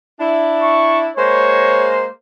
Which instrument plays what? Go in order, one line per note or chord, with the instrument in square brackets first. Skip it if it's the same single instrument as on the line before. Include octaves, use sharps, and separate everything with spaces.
[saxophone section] D4 E4
[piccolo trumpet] C#6
[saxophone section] G#3 A#3 C5 [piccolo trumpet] C#5